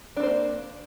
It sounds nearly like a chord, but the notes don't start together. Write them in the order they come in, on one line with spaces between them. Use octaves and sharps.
D4 C4 C5 A#3